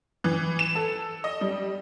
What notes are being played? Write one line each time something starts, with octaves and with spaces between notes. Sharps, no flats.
E3
E7
A4
D#5
G3